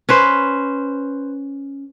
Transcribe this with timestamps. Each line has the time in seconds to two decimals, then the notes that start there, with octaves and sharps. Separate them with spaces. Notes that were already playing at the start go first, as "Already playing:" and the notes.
0.09 C#4 B4 C5